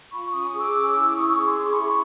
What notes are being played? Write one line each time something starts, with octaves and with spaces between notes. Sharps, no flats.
F4 B5 C#6
C#4 C#6 D#6
G#4
D6 E6
C#4
D6 E6
E4
C#4 C#6 D#6
G#4
C6 D6
C#4 C6
B5 C#6
E4